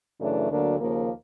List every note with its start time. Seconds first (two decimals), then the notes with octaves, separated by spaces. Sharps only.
0.19 F#2 C#3 E3 A3 D4
0.49 D2 D3 F#3 A#3 D4
0.80 D#2 C#3 F3 A#3